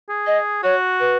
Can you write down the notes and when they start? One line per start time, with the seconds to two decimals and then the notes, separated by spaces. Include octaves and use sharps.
0.09 G#4
0.27 D#5
0.63 F#4 C#5
1.00 B4